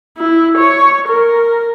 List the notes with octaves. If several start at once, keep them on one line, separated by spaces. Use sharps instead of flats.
E4
C#5
A#4